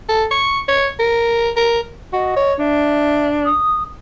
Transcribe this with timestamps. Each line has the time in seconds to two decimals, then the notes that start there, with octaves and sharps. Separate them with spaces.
0.09 A4
0.31 C#6
0.68 C#5
0.99 A#4
1.56 A#4
2.13 F#4 D#5
2.36 C#5
2.59 D4 E5
3.45 D#6